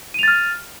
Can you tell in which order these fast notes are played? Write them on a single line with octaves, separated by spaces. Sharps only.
D#7 F7 A6 F6